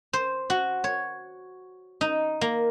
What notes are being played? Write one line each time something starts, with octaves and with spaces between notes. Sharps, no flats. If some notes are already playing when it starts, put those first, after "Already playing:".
C5
F#4
C#5
D#4
A#3